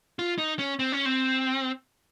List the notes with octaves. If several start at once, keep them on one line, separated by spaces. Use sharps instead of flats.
F4
D#4
C#4
C4
C#4
C4